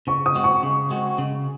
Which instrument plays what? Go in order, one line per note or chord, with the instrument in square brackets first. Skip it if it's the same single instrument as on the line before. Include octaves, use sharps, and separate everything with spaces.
[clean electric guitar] C#3 [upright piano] C#6
[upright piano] D#6
[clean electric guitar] G#3 C4 F#4
[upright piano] C#6
[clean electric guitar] C#3
G#3 C4 F#4
C#3